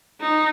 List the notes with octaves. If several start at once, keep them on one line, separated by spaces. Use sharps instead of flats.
D#4